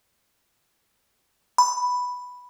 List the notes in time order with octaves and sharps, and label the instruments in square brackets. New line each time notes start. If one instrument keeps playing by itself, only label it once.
[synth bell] B5